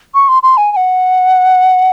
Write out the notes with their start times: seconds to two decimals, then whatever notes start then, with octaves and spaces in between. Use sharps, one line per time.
0.14 C#6
0.28 C6
0.43 C6
0.57 G#5
0.72 G#5
0.76 F#5